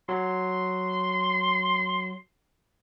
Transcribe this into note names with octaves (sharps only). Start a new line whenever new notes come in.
F#3 C6